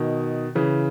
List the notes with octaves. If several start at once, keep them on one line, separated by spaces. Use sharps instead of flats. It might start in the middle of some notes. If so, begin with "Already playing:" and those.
Already playing: B2 D#3
C#3 E3